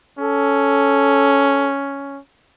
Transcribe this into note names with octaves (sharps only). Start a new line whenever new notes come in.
C#4 A4